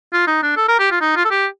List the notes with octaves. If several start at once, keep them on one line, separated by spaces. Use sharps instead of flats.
F4
D#4
D4
A4
A#4
G4
F4
D#4
F4
A4
G4